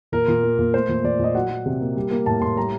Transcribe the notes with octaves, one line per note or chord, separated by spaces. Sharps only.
A#2 A#4
A#2
A#3
A#2
A3 C5
A#2
A#2 D5
A#2 D#5
F#3 F#5
F#3
C3
A#3
G3
A#3
A2 A5
A2 C6
G3 A#5